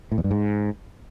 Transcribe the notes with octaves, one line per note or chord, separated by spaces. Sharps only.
A2
E2
G2
G#2